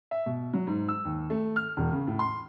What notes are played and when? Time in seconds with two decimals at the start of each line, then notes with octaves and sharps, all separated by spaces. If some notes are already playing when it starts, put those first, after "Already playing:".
0.11 E5
0.26 B2
0.53 F#3
0.67 G#2
0.88 E6
1.05 D#2
1.30 A3
1.56 F6
1.77 E1
1.92 C#3
2.07 A2
2.19 C6